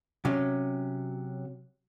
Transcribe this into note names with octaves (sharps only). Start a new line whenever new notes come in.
C3 F#3 C#4